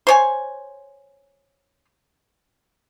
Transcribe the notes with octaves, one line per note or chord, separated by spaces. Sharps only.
C5 C#5 G#5